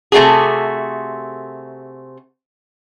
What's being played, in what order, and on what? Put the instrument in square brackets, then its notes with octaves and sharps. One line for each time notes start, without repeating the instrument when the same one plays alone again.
[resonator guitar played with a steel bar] C3 A3 D4 F#4 G#4